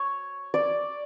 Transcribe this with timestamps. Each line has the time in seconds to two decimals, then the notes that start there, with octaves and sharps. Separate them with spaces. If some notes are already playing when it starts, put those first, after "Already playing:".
Already playing: C#5
0.54 D5